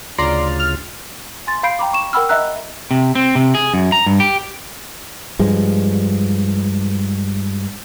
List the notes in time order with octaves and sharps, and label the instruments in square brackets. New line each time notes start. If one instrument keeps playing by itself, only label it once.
[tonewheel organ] D2 C#3 F4 [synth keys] D5 A#5 C6
[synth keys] F6
[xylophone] G#5 C6 A6
F5 B5 G6 C7 D7
G5 A#5 B5 D6
C#6 E7
A#4 F#5 G5 B5 E6 F6
D#5 E5 F#5 A#5 E6 F#6
[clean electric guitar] C3
C4
C3
G#4
F#2
A#5
G2
G4
[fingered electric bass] G2 F3 G#3